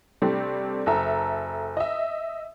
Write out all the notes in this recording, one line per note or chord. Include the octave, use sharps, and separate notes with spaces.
C3 G3 A3 C4 D4
F#1 A4 E5 A#5
D#5 E5